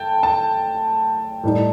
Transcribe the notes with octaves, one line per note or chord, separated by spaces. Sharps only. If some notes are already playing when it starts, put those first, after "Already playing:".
Already playing: A3 G5 A5
A5
A2 G3 D#4